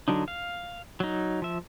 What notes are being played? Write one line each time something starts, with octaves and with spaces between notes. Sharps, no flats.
D3 F#3 D4 D#4
F5
F#3 D#4
F3 E5